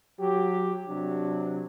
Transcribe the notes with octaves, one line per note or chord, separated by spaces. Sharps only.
F#3 G4
C3 F#3 D4